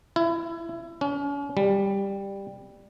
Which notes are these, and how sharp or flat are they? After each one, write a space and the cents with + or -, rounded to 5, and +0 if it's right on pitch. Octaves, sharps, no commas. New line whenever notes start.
E4 +25
C#4 +40
G3 +10